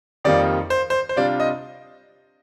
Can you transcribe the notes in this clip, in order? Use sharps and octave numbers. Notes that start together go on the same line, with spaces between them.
F2 D#3 G3 A#3 F4 D5
C5
C5
C5
C3 G3 D4 F4 D5
D#5